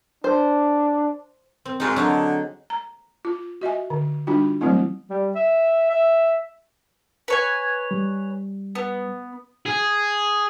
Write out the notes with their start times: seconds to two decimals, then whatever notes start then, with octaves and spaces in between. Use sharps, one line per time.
0.24 D4 C5
1.65 C4
1.80 G#2 D#4 F4 F#4
1.96 D3 F#3 D#4 G#4
2.70 A#5
3.25 F4
3.61 F#4 D#5 E5 G#5
3.90 D3
4.27 G3 D4 D#4 F4 F#4 G5
4.61 E3 F#3 G3 A3 C4 E4
5.10 G3
5.35 E5
5.90 E5
7.28 B4 C#5 G#5
7.91 G3
8.75 B3
9.66 G#4